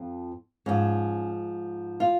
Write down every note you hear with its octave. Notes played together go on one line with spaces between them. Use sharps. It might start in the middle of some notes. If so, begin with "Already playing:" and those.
Already playing: F2 F3
G#2 F3 C#4
F4